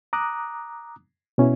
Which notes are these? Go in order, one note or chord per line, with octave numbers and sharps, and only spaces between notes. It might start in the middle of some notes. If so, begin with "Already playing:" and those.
A#5 D6 D#6 F#6
B2 C#4 E4